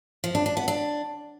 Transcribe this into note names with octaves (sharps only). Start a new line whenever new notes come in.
F3
D4
D4
B3
D4